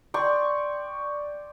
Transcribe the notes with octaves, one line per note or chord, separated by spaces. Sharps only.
D5 G5 C6 C#6